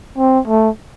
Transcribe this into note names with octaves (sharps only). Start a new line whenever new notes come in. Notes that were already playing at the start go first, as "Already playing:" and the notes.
C4
A3